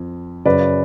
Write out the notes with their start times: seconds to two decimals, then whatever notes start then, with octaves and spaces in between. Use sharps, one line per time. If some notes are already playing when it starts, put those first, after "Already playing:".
Already playing: F2 F3
0.45 F#2 C#3 F#3 B4 D5